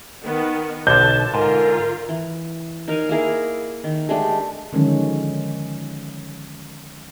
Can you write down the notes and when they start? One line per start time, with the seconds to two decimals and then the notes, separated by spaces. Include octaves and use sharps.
0.24 D#3 B3
0.87 B1 D3 A5 G6
1.34 G#2 D3 F4 A#4
2.09 E3
2.88 D#4 A#4 F5 G#5
3.09 A#3 E4 G#4 A#4
3.84 D#3
4.09 G#3 A3 D4 G4
4.73 D3 D#3 F3 F#3 G#3 C#4